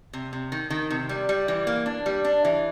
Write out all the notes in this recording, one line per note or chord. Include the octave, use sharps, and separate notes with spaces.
C3
C3
D#3
D#3
C3
G3
G3
E3
A#3
D4
G3
D4
E3